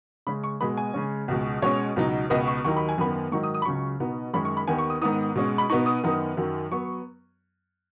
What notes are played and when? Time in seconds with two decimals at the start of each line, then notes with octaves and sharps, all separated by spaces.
0.27 C#3 G#3 C#4 B5
0.44 C#6
0.60 B2 G#3 B3 B5
0.77 G#5
0.94 C#3 G#3 C#4
1.28 C#2 B2 G#3
1.62 B2 G#3 C#4 C#5
1.96 C#2 B2 F#3 D#4
2.30 C#2 B2 B3 D#5
2.47 C#6
2.64 D#2 D#3 F#3 D#4 C#6
2.77 B5
2.89 G#5
2.98 F#2 D#3 B3 B5
3.32 G#2 D#3 F#3 D#4 C#6
3.43 D#6
3.54 D#6
3.62 B5
3.65 C#2 C#3 F#3 C#6
4.00 B2 B3 D#4
4.34 F#2 D#3 G#3 C#4 B5
4.45 C#6
4.57 B5
4.67 D#2 D#3 B3 G#5
4.79 C#6
4.90 D#6
5.01 G#2 D#3 B3 D#4 D#6
5.35 B2 G#3 C#4
5.58 B5
5.69 D#4 C#6
5.72 B2 B3
5.86 D#6
6.04 F#2 D#3 B3 D#4
6.37 F#2 D#3 F#3
6.71 F#3 B3 C#6